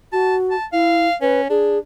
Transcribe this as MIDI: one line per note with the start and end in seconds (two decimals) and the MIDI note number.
0.12 0.55 66
0.12 0.36 81
0.51 0.65 81
0.73 1.08 64
0.73 1.14 77
1.21 1.46 61
1.21 1.41 71
1.50 1.78 62
1.50 1.78 68